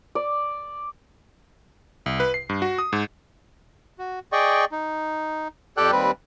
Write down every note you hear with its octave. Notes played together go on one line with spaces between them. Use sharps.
D5
C2
B4
C7
G2
F#4
D#6
G#2
F#4
G#4 D5 D#5 G5 C#6
D#4
F2 G4 A4 D5 G5 F#6
D#2 G3 C4 B4